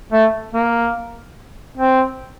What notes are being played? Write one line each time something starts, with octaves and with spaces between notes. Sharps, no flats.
A3
A#3
C4